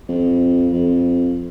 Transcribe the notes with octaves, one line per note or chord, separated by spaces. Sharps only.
F2
F2